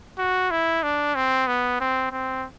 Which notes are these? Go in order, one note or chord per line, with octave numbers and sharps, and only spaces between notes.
F#4
E4
D4
C4
B3
C4
C4